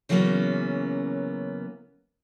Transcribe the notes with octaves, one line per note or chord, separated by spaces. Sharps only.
C#3 E3 F#3 A#3 B3 C#4